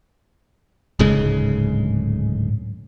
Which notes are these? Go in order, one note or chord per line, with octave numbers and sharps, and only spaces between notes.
D1 G#2 C#3 G#3